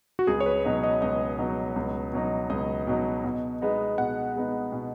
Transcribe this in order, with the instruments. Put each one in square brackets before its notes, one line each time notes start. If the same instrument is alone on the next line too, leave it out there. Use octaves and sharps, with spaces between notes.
[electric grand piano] F#4
[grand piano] C#2 [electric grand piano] G#4
[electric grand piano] C#5
B4
[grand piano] B2 F#3 D#4
[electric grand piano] D#5
[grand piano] C#2 [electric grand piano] D#5
[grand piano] B2 F#3 D#4
C#2
B2 F#3 D#4
[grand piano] C#2 [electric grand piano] D#5
[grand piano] B2 F#3 D#4
B2
G#3 B3 D#4
[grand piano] B2 [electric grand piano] F#5
[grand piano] G#3 B3 D#4
B2